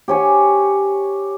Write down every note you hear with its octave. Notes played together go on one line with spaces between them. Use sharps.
G4 C#5 G#5